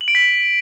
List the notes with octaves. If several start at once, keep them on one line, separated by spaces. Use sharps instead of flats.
F#7
D7
B6